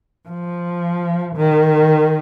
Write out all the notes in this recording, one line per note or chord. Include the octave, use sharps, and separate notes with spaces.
F3
D#3